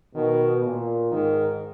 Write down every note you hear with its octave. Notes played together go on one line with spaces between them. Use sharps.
B2 D#3
A#2
G#2 D#3